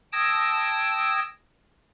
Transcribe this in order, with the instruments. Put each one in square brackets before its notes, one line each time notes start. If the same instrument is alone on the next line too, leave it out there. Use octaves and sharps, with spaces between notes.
[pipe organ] G5 A5 D#6 E6 G#6 A#6